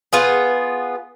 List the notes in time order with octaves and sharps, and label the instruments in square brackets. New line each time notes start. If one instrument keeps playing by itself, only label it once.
[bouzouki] B3 F4 G#4